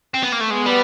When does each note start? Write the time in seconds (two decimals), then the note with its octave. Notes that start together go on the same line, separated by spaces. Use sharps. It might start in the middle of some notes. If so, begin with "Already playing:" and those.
0.14 C4
0.23 B3
0.32 A#3
0.41 A3
0.50 G#3 B3
0.66 G3